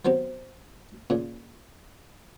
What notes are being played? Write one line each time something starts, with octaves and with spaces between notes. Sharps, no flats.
F#3 B3 C4 G4
A#2 C#3